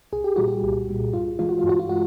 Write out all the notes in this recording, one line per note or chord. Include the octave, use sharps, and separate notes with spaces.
C2 G#4
G4
A#2 G3 F#4
G4
C2
A#2 G3
G2 F4
E3 G#3 F4
F#4
F4
G2
F#4
F4
G#3 F#4